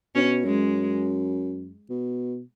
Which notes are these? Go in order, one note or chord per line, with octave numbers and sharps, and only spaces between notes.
B2 C#4
F#2 G#3
B2